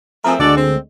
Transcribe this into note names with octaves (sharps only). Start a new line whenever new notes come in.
F3 A3 C4 G#4 A#4
D2 D3 G#3 F#4 A4 D5
C4